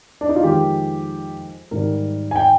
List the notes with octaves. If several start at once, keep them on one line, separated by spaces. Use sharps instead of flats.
D4
D#4
F4
F2 D#3 G#3 G4
G#2 D#3 G3 A#4
G#5
G5